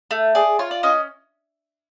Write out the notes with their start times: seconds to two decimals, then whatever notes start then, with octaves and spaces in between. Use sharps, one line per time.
0.11 A3
0.35 G#4 D5
0.59 F4 C#5
0.71 D5
0.83 C#4 D#5